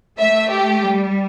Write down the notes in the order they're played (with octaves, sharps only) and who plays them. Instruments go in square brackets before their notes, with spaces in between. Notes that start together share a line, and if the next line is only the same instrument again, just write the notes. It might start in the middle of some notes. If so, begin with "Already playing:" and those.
[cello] A3 [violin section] E5
[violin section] G4
[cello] G3